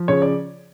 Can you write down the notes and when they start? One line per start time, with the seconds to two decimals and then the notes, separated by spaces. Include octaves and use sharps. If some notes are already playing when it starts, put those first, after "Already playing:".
Already playing: F3
0.08 C#3 C#5
0.22 D5